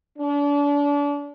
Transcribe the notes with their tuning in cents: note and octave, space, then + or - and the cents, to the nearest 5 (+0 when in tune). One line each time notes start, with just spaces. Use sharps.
D4 -35